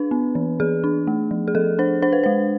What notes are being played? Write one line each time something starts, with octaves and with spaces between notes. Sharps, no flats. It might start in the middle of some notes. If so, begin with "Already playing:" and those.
Already playing: D4 B4
B3
E3
E3 G#4
D4
A3
F3
G#4
F3 A4
D4 C5
D4 C5
B4
G#3 C5